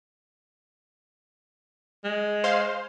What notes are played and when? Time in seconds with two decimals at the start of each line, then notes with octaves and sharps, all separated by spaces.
2.04 G#3
2.44 C5 F5 C6